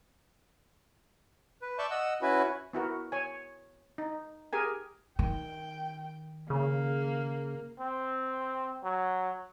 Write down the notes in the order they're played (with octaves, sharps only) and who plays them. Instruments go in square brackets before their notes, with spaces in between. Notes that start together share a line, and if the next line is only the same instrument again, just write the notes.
[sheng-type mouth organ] B4
D5 E5 A5 C#6 G6
D#5 F#5 E6
C#4 E4 F#4 B4
[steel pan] B3 E4 F#4 A#4
C#5 G#5
D#4
G4 G#4 A#4 G#5
[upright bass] D#3 [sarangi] G5
[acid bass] C#3 [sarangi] A#3
[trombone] C4
F#3